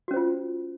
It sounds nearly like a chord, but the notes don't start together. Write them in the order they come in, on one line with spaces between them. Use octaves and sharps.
F#4 C#4 C5 F4